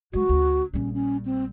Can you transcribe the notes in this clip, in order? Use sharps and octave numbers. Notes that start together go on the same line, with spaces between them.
F#3 G#3 F#4
D2 C#4
A#1 G3 C#4
C#4
C4